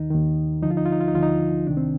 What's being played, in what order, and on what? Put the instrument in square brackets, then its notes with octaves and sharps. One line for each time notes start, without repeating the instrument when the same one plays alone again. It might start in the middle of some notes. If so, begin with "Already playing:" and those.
Already playing: [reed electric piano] D#2 D#3 D#4
D#2 D#3
D2 D3 F3 D#4
F4
D#4
F4
D#4
F4
D#4
D2 D3 F3 F4
D#4
C2 C3 D#3 D4
C4